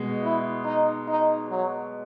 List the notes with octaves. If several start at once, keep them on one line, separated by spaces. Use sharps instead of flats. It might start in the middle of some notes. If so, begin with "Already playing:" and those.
Already playing: B2 G#3
E4
D#4
D#4
F#3